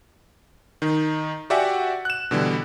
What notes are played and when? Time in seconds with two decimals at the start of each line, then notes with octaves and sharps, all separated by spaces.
0.82 D#3 D#4
1.50 F#4 G4 D5 E5 F#5 G#5
2.05 F#6 E7
2.31 B2 D3 E3 G3